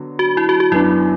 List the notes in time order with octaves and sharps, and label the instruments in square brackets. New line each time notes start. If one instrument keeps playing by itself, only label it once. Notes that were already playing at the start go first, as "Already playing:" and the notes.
Already playing: [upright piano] D3 F#3 B3
[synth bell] F#4
E4
F#4
F#4
[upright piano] F#2 F#3 B3 D4 [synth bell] E4